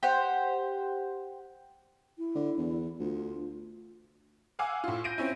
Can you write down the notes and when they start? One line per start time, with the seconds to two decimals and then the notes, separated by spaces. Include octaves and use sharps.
0.03 G4 C5 F#5
2.18 E4
2.35 D3
2.58 E2
2.99 D2 F4
4.59 F5 F#5 G#5 D6 E6
4.84 A2 F4
5.04 G6 A#6 D7 D#7
5.18 C4 C#4 E4